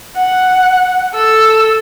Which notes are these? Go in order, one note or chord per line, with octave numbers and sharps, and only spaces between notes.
F#5
A4 E6